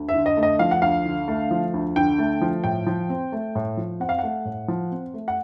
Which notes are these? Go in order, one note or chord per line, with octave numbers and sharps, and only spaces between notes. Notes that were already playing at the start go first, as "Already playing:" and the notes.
Already playing: D2
E5
D3
D#5
A3
D#5
F3 F5
F#5
D2 F5
D3
A3
F3
D2
D3 G5
A3
F3
A2 G5
F3
C4
A3
A2
F3
C4 F#5
F5
A3 F#5
A2
F3
C4
A3
F#5